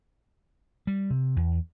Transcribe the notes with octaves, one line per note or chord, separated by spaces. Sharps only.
G3
C3
E2